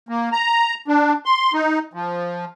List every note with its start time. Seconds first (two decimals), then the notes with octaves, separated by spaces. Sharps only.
0.09 A#3
0.32 A#5
0.88 D4
1.26 C6
1.54 D#4
1.93 F3